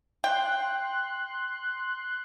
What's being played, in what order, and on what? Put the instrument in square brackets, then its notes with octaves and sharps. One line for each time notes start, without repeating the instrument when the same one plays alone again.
[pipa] G5 [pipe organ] C6 F#6